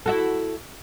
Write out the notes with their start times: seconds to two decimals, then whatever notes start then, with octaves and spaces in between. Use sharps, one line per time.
0.06 E4 F#4 A4